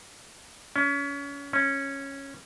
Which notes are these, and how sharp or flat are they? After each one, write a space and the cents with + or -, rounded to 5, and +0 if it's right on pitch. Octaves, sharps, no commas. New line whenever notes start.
C#4 +30
C#4 -10